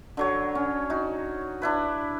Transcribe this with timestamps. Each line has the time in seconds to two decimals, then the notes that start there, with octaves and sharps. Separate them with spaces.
0.17 D3 F#3 C#5
0.55 C#4
0.90 D#4 F#4
1.62 D4 E4 B4